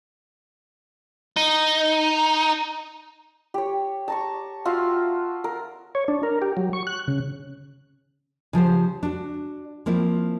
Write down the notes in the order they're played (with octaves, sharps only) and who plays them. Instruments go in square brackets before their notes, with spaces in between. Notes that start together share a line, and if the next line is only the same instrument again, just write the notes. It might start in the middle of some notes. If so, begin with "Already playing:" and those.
[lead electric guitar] D#4
[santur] G4 C#5
A5 A#5 C#6
F4 F#4 E5 F5
A#4
[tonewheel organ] C#5
D4
A#4
G4
F#3
C#6
F#6
C#3
[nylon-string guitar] C#3 F3 G4 C5
D4 F#4
F3 A#3 C4 E4